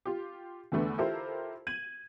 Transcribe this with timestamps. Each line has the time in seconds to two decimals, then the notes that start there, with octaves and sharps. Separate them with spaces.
0.05 F4 G4
0.72 E2 D3 A3 B3
0.98 E4 F4 G4 A4 A#4 C5
1.67 G#6 D#7 F#7